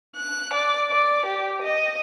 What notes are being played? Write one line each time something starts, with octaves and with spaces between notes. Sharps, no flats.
F#6
D5
D5
G4
D#5